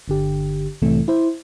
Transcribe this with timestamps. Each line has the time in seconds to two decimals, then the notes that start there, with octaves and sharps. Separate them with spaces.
0.08 G1 D3 G4
0.82 C2 A2 C3 E3 A3
1.08 E4 C5